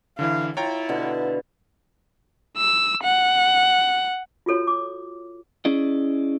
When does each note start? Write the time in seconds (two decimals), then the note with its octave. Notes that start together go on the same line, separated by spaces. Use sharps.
0.19 D3 E3 E4 F5
0.57 E4 F4 C#5 G5 A#5
0.89 B2 D3
2.57 E6
3.04 F#5
4.46 F4 F#4 A4 C#5
4.67 D6
5.65 C#4 E4 G#4 D5 D#5